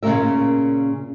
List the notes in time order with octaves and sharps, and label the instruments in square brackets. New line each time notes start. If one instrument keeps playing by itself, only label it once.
[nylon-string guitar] A#2 C#3 G#3 C#4 A#4 E5